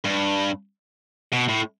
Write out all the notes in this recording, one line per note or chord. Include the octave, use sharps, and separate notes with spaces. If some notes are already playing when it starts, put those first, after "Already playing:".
G2
B2
A2